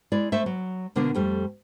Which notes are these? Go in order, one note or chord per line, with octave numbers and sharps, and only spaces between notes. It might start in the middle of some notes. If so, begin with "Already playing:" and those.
G#3 E4 D5
A3 C5 E5
F#3
B2 D3 A#3 B3 D4
F2 G3 A3